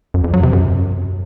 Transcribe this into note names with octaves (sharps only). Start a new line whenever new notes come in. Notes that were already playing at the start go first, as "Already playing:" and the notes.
F#2
F2
F#3
C3
F#2